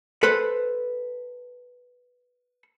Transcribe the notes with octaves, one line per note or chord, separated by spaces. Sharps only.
A4 B4 C5